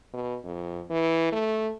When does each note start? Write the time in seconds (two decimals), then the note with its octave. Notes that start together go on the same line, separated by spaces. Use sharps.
0.13 B2
0.44 F2
0.90 E3
1.32 A3